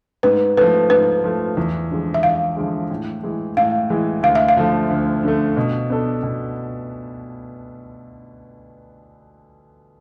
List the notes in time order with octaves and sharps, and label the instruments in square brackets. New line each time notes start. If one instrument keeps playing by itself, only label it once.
[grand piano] G#2 [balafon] B4
[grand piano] F3 A3 [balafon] B4
[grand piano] G#2 [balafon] B4
[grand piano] F3 A3
E2
D3 F3 G#3
[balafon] E5
[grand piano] E2 [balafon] F5
[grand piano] D3 F3 G#3
A2
E3 G#3
[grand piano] A2 [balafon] F5
[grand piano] E3 G#3
[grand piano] D2 [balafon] F5
[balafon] E5
F5
[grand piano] D3 F3 A3
D2
D3 F3 A3
B2
B3 D4 A4
B2